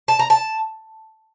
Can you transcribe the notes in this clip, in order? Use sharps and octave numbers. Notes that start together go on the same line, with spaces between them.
A5
A#5
A5